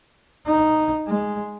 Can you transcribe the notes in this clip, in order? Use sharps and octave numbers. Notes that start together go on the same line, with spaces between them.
D#4
G#3